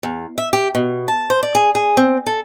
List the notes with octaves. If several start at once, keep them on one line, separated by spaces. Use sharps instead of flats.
E2
E5
G4
B2
A5
C5
D5
G#4
G#4
C4
A4